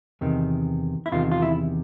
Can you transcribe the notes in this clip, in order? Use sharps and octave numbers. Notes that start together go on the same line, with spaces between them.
E2 C3 D#3
E4
E2 C3 D#3 F4
F4
E4